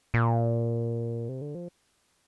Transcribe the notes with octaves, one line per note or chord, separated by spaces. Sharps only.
A#2
C3
D3
F3